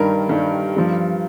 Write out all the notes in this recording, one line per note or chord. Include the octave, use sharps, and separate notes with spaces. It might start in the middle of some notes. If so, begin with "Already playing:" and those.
Already playing: G2 D#3 G3 A#4
G2 D#3 G3
G2 F3